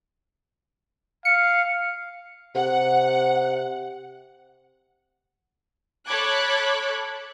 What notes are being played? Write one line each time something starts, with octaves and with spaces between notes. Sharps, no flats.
F5 C#7
C3 F#5
A4 C#5 B5 D6 F#6 G#6